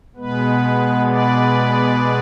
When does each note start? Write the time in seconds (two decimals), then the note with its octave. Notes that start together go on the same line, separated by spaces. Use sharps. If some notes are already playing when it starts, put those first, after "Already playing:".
0.16 B2 G#3 B3 B4
1.07 B4 D5